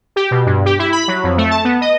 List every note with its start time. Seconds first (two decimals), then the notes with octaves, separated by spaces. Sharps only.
0.16 G4
0.31 B2
0.46 G2
0.66 G4
0.79 E4
0.92 B5
1.08 F#3
1.24 F2
1.38 A3
1.51 A5
1.65 B3
1.81 D#5